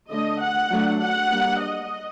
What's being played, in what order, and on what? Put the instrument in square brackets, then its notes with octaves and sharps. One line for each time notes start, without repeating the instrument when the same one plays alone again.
[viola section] D3 A3 D4 D#5
F#5
F#3 A3 D4
F#5
G3 A#3 D4
D#5